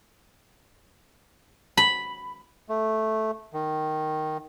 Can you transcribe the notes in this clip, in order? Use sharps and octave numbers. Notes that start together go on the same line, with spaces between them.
B5
A3
D#3